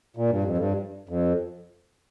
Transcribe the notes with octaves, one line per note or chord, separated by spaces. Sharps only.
A#2
G2
F2
G2
F2